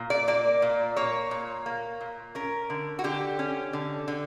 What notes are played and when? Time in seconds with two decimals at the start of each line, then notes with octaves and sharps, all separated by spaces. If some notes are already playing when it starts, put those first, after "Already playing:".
Already playing: A#2
0.10 D5
0.28 A#3 D5
0.62 A#2
0.96 A#3 C#5
1.31 A#2
1.66 A#3
2.01 A#2
2.35 C#4 A#4
2.70 D3
2.99 F#4
3.04 D3 G4
3.39 C#4
3.73 D3
4.08 D3